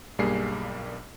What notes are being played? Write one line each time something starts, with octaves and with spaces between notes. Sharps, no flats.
B1 G2 G3 A#3 G#4 C7